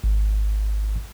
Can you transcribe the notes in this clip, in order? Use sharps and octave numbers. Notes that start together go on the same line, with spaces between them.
G#1